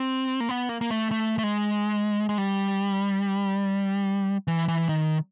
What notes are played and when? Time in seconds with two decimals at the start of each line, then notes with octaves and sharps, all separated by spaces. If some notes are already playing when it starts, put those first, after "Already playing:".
Already playing: C4
0.40 A#3
0.49 B3
0.69 A#3
0.81 A#3
0.90 A3
1.11 A3
1.38 A3
1.43 G#3
2.29 G#3
2.38 G3
4.47 E3
4.68 E3
4.89 D#3